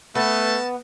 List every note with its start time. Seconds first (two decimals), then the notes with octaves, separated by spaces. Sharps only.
0.15 A3 B3 C#4 A5